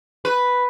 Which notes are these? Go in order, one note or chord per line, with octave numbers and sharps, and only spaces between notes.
B4